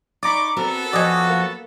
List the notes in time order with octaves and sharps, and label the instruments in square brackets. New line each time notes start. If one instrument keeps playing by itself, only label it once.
[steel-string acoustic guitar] D#4 [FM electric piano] D5 A#5 [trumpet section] B5 C#6 D6
[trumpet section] B3 A4 [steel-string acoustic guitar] C4 F#4 A#4
[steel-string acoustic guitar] F2 F3 [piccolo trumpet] F#4 [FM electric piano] D5 D#5 G#5
[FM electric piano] A#3